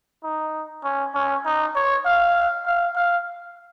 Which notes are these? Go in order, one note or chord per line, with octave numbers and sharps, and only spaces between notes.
D#4
C#4
C#4
D#4
C#5
F5
F5
F5